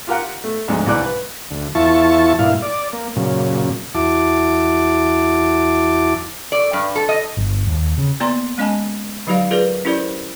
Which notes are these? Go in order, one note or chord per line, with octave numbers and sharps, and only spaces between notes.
F4 G4 A#4 F#5
A3
D2 G#2 F3 G#3
C2 E3 G3 D5 F#6
B4
D2
E2 E4 F4 A5 C#6
G2 A#2 E4 F5
D5
A#3
F#2 A#2 C#3
E2 E4 F#4 A5 D6
D5
G2
A4
D#5
G1
D#2
C#3
A#3 B3 D5 G5 A#5 C6
G#3 C#4 D#5 G#5 A5
D3 F#3 D#4 G4 D5 F5
F4 G#4 A#4 B4 D5
C#4 E4 G4 A#4 C5 D5